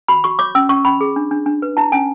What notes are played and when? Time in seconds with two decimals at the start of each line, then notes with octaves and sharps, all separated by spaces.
0.08 F#4 B5
0.24 F#4 C#6
0.39 C#5 D6
0.55 C#4 E6
0.69 C#4 C#6
0.85 C#4 B5
1.01 G#4
1.16 D4
1.31 D4
1.46 D4
1.62 B4
1.77 E4 A5
1.92 C#4 G#5